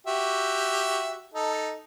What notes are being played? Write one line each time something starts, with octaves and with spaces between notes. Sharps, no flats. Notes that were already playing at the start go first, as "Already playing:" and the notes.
F#4 G4 E5
D#4 A4